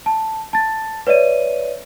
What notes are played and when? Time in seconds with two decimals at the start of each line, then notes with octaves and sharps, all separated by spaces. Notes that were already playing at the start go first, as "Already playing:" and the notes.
0.06 A5
0.53 A5 A6
1.07 B4 C#5 D5 E5 D#7